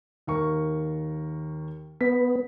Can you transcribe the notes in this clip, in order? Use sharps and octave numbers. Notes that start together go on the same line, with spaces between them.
D#2 A#4 C#6
B3 B6